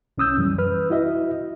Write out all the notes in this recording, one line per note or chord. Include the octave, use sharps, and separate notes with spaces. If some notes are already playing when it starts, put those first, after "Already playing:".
C2 C#4 D#6 E6 G6
F#2 E3 G3
B4 F6
E4 F#4 D#5 E5